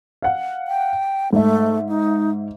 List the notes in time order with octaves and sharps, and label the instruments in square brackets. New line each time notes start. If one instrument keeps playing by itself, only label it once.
[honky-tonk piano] F5 F#5
[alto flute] G5
[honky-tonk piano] G#2 E5 [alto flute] A3
[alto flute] D#4